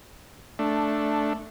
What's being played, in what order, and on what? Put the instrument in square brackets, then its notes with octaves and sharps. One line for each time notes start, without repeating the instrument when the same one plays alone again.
[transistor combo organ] A3 D4